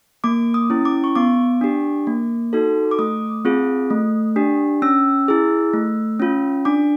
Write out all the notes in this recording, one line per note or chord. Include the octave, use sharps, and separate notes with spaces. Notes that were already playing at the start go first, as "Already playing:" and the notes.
A#3 D6
D#6
C#4 E4
D6
C#6
B3 D6
D4 G4
A#3
D#4 F#4 A4
D6
A3 D#6
C4 F4 G#4
A3
D4 G4
C#4 E6
E4 G#4
A3
C#4 F4
D4 D6